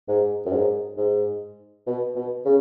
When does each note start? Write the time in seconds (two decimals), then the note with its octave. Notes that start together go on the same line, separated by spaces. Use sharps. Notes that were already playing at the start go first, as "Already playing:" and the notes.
0.08 G#2
0.46 F#2
0.53 G#2
0.97 G#2
1.87 B2
2.15 B2
2.45 C#3